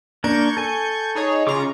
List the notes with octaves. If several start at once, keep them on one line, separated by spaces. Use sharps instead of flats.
A#3 D4 A#4 C#6 G6 G#6
A4 G#5
D#4 G#4 C#5
C#3 F4 A#5 C#6 D6